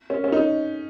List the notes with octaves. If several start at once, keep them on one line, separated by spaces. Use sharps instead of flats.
C#4
C#4
D#4